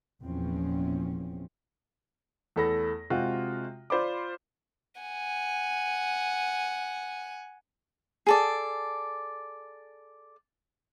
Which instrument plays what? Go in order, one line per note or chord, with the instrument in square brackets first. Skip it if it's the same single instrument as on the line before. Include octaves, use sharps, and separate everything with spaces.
[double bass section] F1 E2 A#2 F3 C4 C#4
[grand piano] E2 A3 A4 B5 A#6
C3 G#3 C4 F4 F#4
F4 C5 D5 B5 D6
[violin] F#5 G#5
[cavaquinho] G#4 A4 D5